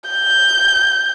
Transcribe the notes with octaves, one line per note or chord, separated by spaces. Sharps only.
G6